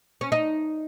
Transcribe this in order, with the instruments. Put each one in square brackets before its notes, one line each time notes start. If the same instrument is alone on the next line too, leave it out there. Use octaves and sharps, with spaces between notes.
[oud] C#4
D#4